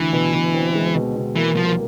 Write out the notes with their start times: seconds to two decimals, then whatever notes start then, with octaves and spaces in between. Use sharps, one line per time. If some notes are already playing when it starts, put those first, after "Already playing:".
Already playing: D2 E3
0.13 B2
0.33 B2
0.54 C4
0.75 G#3
0.95 B2
1.16 B2
1.35 E3 A#3
1.56 C2 F3